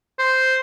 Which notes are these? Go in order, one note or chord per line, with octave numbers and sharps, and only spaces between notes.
C5